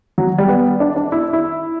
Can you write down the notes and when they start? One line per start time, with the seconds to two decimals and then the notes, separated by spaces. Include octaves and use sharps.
0.18 F#3
0.38 G3
0.49 B3
0.80 D4
0.96 D4
1.12 E4
1.33 E4